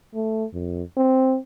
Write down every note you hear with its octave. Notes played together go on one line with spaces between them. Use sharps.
A3
F2
C4